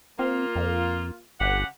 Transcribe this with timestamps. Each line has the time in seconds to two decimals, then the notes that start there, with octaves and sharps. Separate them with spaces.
0.19 A#3 C4 F4
0.56 F2
1.41 G1 C#3 G4 F#5